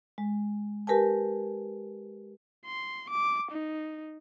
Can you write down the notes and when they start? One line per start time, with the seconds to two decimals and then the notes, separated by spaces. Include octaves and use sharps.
0.18 G#3
0.87 G4 A#4 B4 G#5 A5
2.66 C6
3.10 D6
3.51 D#4